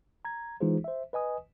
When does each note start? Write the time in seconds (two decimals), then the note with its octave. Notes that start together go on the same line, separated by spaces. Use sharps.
0.25 A#5 G#6
0.61 E3 G#3 D#4 F4 G#4 C5
0.84 C5 E5
1.13 B4 D#5 G#5 D#6